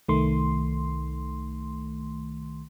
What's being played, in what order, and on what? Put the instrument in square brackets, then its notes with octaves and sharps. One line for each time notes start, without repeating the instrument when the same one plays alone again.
[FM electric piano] C2 D#3 A3 C6